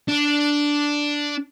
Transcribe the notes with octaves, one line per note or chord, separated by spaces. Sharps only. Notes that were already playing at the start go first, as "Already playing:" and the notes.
D4